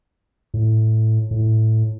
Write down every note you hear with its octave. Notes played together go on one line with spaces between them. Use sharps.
A2
A2